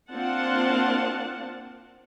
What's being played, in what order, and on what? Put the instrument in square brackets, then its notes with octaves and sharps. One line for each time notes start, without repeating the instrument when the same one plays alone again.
[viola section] A#3 C4 D4 F4 F#5 A5